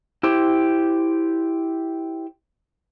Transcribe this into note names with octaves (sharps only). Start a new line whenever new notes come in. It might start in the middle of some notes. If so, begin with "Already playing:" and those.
E4 G4 C5